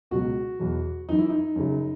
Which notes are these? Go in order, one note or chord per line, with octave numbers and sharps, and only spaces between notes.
C#2 B2 F#3 F#4
E2 B2 F#3
F#2 E3 D#4
E4
D#4
F#2 C#3 F#3